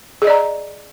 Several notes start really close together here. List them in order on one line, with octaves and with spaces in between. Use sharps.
G#4 D#5 D5 A#5